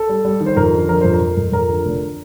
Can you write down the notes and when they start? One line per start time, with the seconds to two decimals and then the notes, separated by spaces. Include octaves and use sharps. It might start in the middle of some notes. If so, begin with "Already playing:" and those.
Already playing: A4
0.09 G3
0.25 G3
0.41 D#3
0.46 C5
0.56 F2 A#4
0.73 D3
0.89 F3 A#4
1.01 F2 C5
1.13 A#4
1.20 F2
1.37 F2
1.52 F2 A#4
1.69 D3
1.85 F1